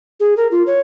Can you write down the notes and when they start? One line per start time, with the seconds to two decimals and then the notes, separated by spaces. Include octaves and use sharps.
0.20 G#4
0.37 A#4
0.51 F4
0.67 C#5